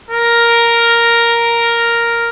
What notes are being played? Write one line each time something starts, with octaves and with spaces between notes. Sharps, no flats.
A#4